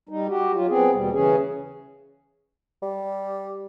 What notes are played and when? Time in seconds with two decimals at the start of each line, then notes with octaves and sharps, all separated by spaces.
0.09 G3 D#4
0.27 F#4 G4
0.53 F#3 F4
0.68 B3 C4 G#4
0.93 D#2 B2 G3
1.12 C#3 E3 C#4 G#4
2.82 G3